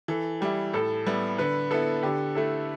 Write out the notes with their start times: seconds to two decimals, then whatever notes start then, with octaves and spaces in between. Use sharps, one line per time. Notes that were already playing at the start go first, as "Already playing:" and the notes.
0.08 E3 A4
0.41 G3 E4 G4
0.73 A2 A4
1.07 G3 B3 E4
1.38 D3 B4
1.71 B3 E4 A4
2.03 D3 G4
2.35 A3 E4 A4